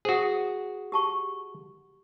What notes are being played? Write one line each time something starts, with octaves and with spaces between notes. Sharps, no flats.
F#4 G#4 C5 D#6
G4 A5 C#6